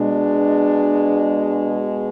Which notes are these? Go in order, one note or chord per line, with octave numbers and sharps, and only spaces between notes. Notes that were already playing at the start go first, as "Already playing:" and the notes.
Already playing: B2 G#3 D4